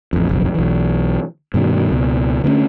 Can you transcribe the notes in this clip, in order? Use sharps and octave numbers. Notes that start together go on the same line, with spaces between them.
A1 F2
F#1 B1 F2
B1 E3
G2 B2 D#3
C#2 B2
D3 A3 B3 C#4